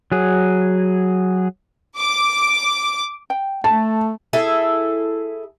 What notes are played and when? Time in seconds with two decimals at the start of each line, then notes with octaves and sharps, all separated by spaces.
0.12 F#3 G#4
1.99 D6
3.30 G5
3.64 A3 A4 A5
4.33 E4 G#4 A4 E5